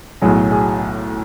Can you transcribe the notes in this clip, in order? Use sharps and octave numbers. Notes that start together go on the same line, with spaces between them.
B1 A2 F#3 G#4
G#4